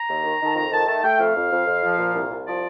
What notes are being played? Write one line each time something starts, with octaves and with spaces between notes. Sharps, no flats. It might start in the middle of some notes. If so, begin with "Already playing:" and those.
Already playing: A#5
D#2
D#3
D#3
A5
F2 A#5
D#3 A5
A3 A5
A3 G5
F2 F5
F2
F2
F2
F3
A#2
C2
C2
F3 D5